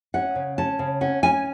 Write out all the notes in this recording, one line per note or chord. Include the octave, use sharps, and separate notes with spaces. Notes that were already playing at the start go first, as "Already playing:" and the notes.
C#4 F#5
C#3
C#4 A5
C#3
C#4 F#5
C#4 G#5